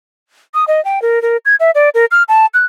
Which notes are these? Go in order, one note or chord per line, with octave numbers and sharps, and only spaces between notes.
D#6
D#5
G5
A#4
A#4
G#6
E5
D5
A#4
F6
A5
F#6